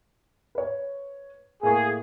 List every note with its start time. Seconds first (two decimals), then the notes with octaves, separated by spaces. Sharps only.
0.55 B4 C#5
1.63 A2 A#3 G#4 C#6